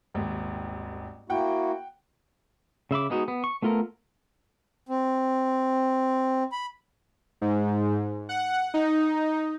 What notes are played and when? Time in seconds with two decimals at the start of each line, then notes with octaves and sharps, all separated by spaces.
0.14 D#1 G#1 D#2
1.30 A#3 E4 F#4 F#5 G5
2.91 C#3 E5 B5 D6
3.10 G#3 B3 D#4 F#4
3.28 B3
3.44 C#6
3.62 A3 B3 F4 A4 A#4
4.89 C4
6.52 B5
7.41 G#2
8.29 F#5
8.74 D#4